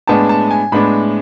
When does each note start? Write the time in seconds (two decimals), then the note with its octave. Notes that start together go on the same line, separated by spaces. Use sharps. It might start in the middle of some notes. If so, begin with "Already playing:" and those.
0.07 A2 G#3 B3 D4 A5
0.29 A5
0.51 G#5
0.72 A2 G#3 B3 D4 B5